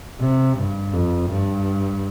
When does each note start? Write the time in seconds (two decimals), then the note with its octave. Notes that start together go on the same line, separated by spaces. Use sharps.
0.20 C3
0.58 G2
0.94 F2
1.30 G2